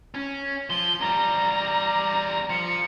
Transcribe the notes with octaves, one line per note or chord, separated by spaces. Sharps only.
C#4
F3 G7
E2 G3 A#5
F3 C#7